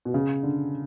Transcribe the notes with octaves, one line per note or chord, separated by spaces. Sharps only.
B2
C#3
D3